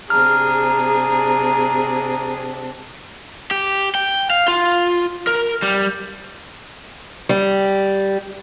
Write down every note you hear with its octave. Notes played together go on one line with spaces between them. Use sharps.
C3 D4 G#4 A#5 F6
G4
G5
F5
F4
A#4
G3
G3